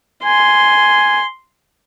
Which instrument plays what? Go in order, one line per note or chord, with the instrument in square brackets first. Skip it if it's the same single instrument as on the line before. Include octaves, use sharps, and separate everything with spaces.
[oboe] G#5 [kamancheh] C6